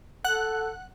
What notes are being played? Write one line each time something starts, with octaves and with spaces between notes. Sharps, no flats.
A4 F#5 F#6